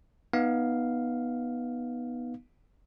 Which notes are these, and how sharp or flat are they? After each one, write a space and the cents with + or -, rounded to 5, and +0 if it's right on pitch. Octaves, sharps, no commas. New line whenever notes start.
B3 -10 D#4 +0 F5 +0